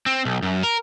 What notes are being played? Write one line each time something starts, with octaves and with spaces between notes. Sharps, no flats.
C4
B1
F#2
A#4